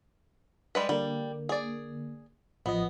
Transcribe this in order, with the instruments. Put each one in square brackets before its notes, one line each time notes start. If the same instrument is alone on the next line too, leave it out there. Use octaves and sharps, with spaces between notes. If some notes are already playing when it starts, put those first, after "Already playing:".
[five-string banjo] G3 G#3 B4
[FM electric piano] D3 A#3 [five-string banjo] G3
[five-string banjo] G#4 D5
[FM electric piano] A1 F3 D#5 [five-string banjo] B3